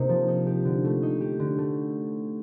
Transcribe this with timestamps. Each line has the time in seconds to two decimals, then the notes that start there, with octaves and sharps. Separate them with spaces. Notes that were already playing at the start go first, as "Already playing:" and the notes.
Already playing: C3 A#3 D#4
0.09 F3
0.28 D#4
0.47 G4
0.65 D3
0.84 A3
1.03 D#4
1.21 G4
1.40 D3
1.58 A3